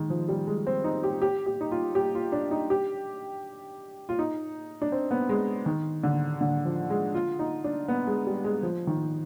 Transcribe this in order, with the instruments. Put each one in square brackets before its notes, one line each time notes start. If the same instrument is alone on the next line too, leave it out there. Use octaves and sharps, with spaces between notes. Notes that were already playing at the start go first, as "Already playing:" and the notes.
Already playing: [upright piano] D#3 G#3
F3
G3
G#3
C4
D#4
G4
G4
G4
D#4
F4
G4
F4
D4
D#4
G4
F4
D#4
D4
C4
B3
G#3
D#3
D3
D3
F3
G#3
F4
D#4
D4
B3
G#3
G3
G#3
F3
D#3